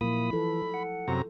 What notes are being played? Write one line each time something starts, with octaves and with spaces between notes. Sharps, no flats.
A#2 F3 F#3 A#3 E4 B5 D#6
E3 A4
F#5
F#2 C3 A#5